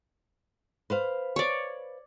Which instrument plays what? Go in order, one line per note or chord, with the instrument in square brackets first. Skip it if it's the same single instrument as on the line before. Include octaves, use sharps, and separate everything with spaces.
[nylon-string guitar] B4 C5 F5
[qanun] C#5 D5